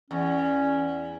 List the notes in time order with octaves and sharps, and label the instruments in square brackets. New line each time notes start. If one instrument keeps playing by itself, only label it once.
[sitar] E2 [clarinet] C#4